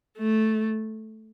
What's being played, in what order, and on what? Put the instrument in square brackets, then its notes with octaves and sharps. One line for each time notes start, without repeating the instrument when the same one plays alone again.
[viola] A3